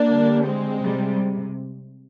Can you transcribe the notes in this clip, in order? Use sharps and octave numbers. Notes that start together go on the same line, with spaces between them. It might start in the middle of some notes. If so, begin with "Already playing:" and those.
Already playing: A#3 D4
D3 G3
G#3 C4
C3 G3